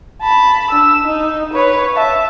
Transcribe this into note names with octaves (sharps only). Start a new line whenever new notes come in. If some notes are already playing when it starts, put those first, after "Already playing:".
A5 B5
D4 E6
D#4
B4 C#5
E5 A5